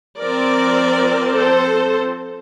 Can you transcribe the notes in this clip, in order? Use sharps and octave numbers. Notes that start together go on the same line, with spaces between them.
F3 C4 A#4 D5
A4 C5